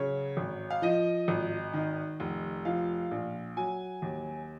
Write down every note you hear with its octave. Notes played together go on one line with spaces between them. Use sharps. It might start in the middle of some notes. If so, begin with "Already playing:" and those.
Already playing: C#3 F#3 C#5
G#1
F5
F3 D#5
G#1
D#3
F1
F3 F5
A#1
F#3 G#5
D#2